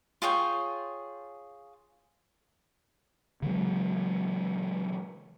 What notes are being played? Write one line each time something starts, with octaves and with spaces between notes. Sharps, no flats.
F4 G#4 C#5 G5
C#3 E3 F#3 G#3